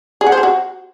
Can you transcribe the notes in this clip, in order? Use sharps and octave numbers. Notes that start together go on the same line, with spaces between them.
G#4
F#5
C5
G#4
F#4